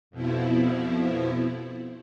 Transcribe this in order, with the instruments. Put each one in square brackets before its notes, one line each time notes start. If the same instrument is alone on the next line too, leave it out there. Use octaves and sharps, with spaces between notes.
[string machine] F2 B2 F3 E4